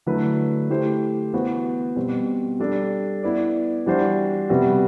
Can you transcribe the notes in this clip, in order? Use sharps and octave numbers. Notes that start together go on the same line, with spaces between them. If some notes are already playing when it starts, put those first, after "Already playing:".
D3 F#3 A3 E4 B4
A3 E4 G4 C5
E3 B3 F#4 C5
B2 G3 C4 F#4
G3 D4 A4
B3 E4 B4 D5
E3 G3 D4 F#4 C5
C3 G3 B3 F#4